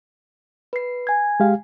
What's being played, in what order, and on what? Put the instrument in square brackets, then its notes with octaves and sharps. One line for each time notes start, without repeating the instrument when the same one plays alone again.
[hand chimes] B4 C7
G#5 G#6
[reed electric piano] G#3 G4 F5